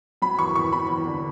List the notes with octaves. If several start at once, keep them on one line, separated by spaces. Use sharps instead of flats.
F#3 B5
E2 C#6
E2 C#6
E2 B5
E2
D3